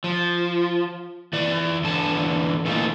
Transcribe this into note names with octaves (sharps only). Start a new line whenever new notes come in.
F3
E3 D5
E2 D3 A5
A#2 E3 A3 D#4 F4